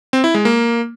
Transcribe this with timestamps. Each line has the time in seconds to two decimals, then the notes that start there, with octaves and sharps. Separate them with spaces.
0.13 C4
0.24 E4
0.34 G#3
0.45 A#3